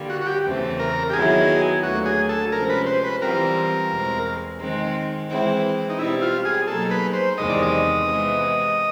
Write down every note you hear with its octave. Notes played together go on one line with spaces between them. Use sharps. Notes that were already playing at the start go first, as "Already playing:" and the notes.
Already playing: D3 G3 A#3
F#4
F#4
G4
E2 C#3 E3 A3 C4
A#4
G4
D#3 F#3 B3 E4 G#4
D2 D3 F#3 A#3 F#4
G#4
A4
C3 F3 G#3 C#4 A#4
B4
C5
B4
E3 G3 C4 F4 A#4
E2 B2 G#3 C4
D#3 G#3 C4
E3 G#3 C4 E4
D#4
B2 G3 C4 E4
F4
G#4
B2 F#3 A#3 D#4 G#4 A4
B4
C5
E2 C3 D#3 G#3 C4 D#5
D5
D#5
C3 E3 G#3 B3